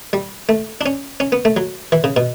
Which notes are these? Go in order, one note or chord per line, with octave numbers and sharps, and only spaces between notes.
G3
A3
D4
C#4
C#4
B3
A3
F#3
E3
C#3
B2